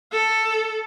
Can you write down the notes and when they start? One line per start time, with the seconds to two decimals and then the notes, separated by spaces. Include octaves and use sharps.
0.12 A4